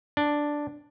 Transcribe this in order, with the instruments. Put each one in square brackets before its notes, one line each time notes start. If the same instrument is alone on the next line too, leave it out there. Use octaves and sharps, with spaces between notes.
[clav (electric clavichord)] D4